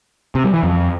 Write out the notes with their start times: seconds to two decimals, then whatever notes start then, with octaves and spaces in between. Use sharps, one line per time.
0.35 C3
0.44 G3
0.54 E3
0.63 F2